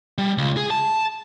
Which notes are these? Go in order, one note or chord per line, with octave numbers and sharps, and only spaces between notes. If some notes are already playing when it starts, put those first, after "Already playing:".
G3
C#2
G#4
A5